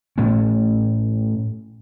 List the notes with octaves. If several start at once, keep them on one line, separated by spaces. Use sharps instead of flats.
A2 A3 C#4